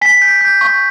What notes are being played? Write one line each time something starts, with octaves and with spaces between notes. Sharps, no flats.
G#5 B6
G6
G6
C#6